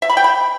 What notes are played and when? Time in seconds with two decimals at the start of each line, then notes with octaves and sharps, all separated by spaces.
0.02 E5
0.09 B5
0.17 G5
0.24 B5